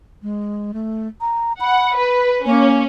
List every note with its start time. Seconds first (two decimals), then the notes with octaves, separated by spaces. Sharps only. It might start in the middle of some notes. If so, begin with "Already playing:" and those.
0.22 G#3
0.74 A3
1.21 A#5
1.60 F#5 B5
1.95 B4
2.46 A#3 C#4